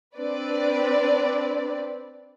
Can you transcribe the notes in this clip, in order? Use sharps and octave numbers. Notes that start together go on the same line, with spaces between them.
C4 D4 B4 D5